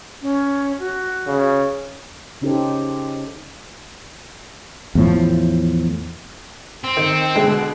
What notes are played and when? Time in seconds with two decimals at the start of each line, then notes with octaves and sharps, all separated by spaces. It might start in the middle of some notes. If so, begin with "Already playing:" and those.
0.22 C#4
0.79 F#4
1.27 C#3
2.41 C#3 C#4 D#4 G4 A4 C5
4.95 E2 A2 F3
6.84 C4
6.97 D#3
7.35 B2 D3 G#3